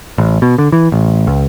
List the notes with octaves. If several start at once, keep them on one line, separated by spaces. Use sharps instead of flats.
A1
B2
D3
E3
A1
C#2